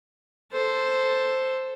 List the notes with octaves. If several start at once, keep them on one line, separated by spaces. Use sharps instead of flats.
A4 C5